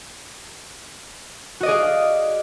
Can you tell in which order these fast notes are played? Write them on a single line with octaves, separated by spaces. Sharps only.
F#4 D#5 D5 G#4 F5